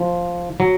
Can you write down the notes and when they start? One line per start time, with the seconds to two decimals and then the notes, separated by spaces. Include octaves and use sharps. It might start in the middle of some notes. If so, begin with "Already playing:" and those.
Already playing: F3
0.60 F#3